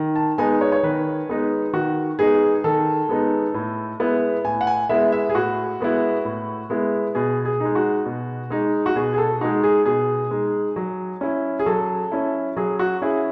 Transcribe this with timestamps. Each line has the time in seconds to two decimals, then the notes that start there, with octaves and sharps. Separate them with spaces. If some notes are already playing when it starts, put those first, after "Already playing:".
Already playing: D#3
0.16 A5
0.38 G#3 B3 D#4 G#5
0.61 C#5
0.72 C#5
0.83 D#3 B4
1.29 G#3 B3 D#4
1.73 D#3 F#4
2.19 G#3 B3 D#4 G#4
2.64 D#3 A4
3.09 G#3 B3 D#4
3.54 A2
4.00 G#3 B3 E4
4.45 A2 G#5
4.61 F#5
4.67 G#5
4.89 G#3 B3 E4 E5
5.12 E5
5.29 G#4
5.35 A2 F#4
5.80 G#3 B3 E4
6.25 A2
6.70 G#3 B3 E4
7.15 B2 G#4
7.45 G#4
7.60 G#3 D#4
7.75 F#4
8.06 B2
8.50 G#3 D#4
8.86 F#4
8.96 B2 G#4
9.14 G#4
9.18 A4
9.41 G#3 D#4 F#4
9.63 G#4
9.86 B2 G#4
10.31 G#3 D#4
10.76 F#3
11.21 C#4 E4
11.59 G#4
11.66 F#3 A4
12.12 C#4 E4
12.56 F#3 G#4
12.79 F#4
13.02 C#4 E4 G#4